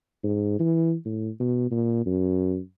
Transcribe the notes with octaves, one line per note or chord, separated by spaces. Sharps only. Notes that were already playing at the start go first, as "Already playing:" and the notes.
G#2
E3
A2
B2
A#2
F#2